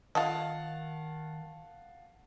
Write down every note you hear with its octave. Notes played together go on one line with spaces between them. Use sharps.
D#3 F4 A4 D#5 F5 F#5 A5